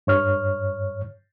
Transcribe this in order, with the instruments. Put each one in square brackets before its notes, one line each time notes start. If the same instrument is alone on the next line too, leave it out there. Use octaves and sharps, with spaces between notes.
[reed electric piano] G2 C#5 F6